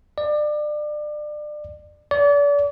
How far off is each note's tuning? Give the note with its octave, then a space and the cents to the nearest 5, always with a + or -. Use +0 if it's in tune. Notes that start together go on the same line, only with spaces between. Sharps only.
D5 +30
D5 -35